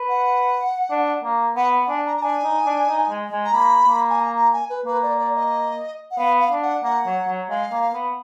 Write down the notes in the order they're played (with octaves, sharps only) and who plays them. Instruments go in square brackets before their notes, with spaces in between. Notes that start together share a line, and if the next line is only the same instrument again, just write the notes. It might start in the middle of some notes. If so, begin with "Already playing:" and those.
Already playing: [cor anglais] B4
[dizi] F#5
[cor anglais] D4
A#3
[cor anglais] B3 [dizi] F#5
[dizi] F#5
[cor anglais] D4 [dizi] G#5
[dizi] A#5
A#5
[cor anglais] D4 [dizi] G#5
[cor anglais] D#4
D4
D#4
G#3
G#3
[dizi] A#5
[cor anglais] A#3 [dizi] B5
[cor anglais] A#3
[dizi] G#5
A#5
A#5
G#5
B4
[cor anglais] A#3 [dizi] B4
[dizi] D5
D5
D#5
F#5
[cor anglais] B3 [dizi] F5
[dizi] F5
[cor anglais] D4
[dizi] F#5
[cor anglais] A#3 [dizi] F#5
[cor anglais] F#3
F#3
[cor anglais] G#3 [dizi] F5
[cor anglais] A#3
B3